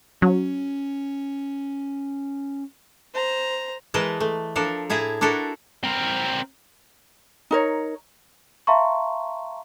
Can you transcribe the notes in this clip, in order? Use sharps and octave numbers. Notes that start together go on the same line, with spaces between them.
F#3 C#4
C5 A#5
E3 G#3 A#4 B4 D#5 A5
A3
F3 D4 A4 A#4
A2 E4 G#4 A5 A#5
D4 E4 F#4 A4 A#4
C4 A#4
D#4 A#4 C#5
E5 F5 A5 A#5 C6 C#6